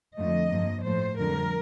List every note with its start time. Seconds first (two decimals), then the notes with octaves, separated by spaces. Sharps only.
0.17 F2 D3 F3 A3 D#5
0.50 G2 F3 A#3
0.84 A2 F3 A3 C5
1.18 F2 D3 G3 A#4